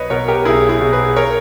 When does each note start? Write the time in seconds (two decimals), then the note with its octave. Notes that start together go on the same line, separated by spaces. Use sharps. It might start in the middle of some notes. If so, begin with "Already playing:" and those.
Already playing: B1 B4 C#5 D#5
0.10 B2 A#4 C#5
0.28 G4 A#4
0.45 B1 E4 G#4
0.69 E4 G#4
0.80 B2
0.93 G#4 B4
1.16 A#4 C#5